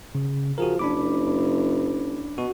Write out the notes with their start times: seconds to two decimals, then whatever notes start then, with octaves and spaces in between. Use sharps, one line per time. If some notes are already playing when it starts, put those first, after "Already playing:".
0.15 C#3
0.58 F3 F#4 G#4 A#4
0.79 F#1 D4 B5 D6
2.38 B2 F#4